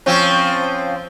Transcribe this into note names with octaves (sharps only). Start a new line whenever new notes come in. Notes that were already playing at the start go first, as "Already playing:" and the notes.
F3 C4 C#4